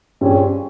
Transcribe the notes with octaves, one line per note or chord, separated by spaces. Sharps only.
G2 G3 C4 C#4 F4 G#4